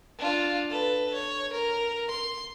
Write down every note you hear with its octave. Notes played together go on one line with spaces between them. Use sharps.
D4 F4
A4 B4
C#5
A#4
C6